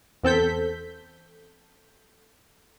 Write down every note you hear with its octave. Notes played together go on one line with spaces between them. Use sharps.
E2 C4 A4 G6 B6